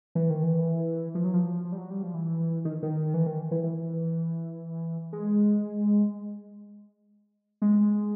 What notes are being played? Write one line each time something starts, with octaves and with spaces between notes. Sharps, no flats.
E3
D#3
E3
F3
F#3
F3
F3
G3
F#3
G3
F3
E3
D#3
D#3
E3
D#3
E3
E3
G#3
G#3